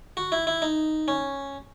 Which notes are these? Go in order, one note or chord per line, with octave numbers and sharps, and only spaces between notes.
F#4
E4
E4
D#4
C#4